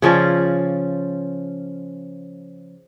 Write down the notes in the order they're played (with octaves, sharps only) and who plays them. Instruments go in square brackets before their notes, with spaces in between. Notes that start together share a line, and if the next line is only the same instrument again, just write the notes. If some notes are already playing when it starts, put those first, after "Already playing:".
[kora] C#3 F3 C#4 D5